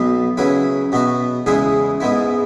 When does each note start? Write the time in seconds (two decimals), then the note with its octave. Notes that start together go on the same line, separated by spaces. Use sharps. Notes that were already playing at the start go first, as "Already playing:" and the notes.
Already playing: B1 B2 B3
0.37 C#3 F#3 E4 B4
0.92 B2 B3 F#4 E5
1.46 E2 C#3 G#3 E4 G#4
2.00 G#2 G#3 B3 E4